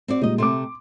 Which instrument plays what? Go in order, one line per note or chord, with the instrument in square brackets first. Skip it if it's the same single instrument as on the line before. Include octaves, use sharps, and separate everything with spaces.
[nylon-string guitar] C4 F#4 D5
[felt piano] A#2 G3 G#3 [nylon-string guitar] D#4 D#5
[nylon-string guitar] C3 A3 [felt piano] C6 D6